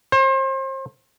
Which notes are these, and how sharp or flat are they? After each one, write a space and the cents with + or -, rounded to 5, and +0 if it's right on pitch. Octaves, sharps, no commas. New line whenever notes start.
C5 +35